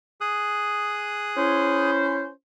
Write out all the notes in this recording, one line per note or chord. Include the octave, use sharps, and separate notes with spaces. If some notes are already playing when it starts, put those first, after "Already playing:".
G#4 D#6 F#6
C#4 E4 C5